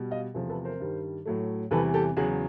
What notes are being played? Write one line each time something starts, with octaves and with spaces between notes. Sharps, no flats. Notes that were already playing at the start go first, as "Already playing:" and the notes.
Already playing: B2 G3
D#5 F5
E2 C3 F3 A3
A4 B4
A#4 C5
G2 D#3 G3
A2 F#3 A3
E2 C3 E3 G3 A4 B4
G4 A4
E2 C#3 F#3 F#4 G#4